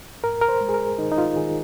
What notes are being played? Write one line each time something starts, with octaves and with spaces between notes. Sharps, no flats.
G#2 A#4
A#4
C5
G#3
G#4
A#4
D#3 D#4
D#4
F4
D#3 G#4